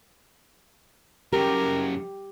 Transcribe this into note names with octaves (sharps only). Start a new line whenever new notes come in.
F#2 C#3 G4 A#4